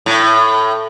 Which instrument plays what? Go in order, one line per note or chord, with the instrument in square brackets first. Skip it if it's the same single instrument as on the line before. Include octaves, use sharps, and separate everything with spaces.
[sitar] A2